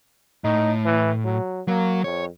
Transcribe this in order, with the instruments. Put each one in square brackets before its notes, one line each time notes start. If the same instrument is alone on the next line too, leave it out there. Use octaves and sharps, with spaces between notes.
[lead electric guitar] A2 [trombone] D#4
[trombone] E3
F#3
[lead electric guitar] F#3 [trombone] A#3
[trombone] F2 [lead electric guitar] C#5